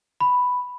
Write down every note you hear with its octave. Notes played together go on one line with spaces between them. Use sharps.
B5